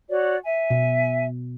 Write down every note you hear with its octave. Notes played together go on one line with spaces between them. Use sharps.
F#4 C#5 D5
E5 G#5
B2